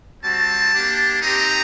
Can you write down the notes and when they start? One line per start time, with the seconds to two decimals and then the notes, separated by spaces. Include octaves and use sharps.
0.23 G3 C4 F#4 A5
0.72 A#3 D4 G4
1.22 C4 D#4 G4 A#5